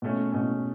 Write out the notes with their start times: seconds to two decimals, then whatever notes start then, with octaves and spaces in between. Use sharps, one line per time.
0.02 B2 A3 C#4
0.32 B2 A3 C#4